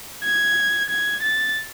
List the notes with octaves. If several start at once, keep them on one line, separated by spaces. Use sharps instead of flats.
G#6
G#6
A6